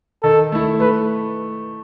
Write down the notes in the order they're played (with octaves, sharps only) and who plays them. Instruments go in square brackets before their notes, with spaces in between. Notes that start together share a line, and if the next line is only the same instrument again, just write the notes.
[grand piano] D#3 [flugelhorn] A4
[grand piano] A3 E4
[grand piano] A3 [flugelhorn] B4